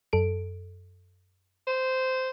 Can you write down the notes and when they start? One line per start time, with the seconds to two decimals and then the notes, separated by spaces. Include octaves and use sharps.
0.13 F#2 A4 D7
1.67 C5